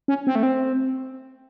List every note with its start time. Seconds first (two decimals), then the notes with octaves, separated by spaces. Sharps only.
0.08 C#4
0.27 C4
0.35 A3
0.43 C4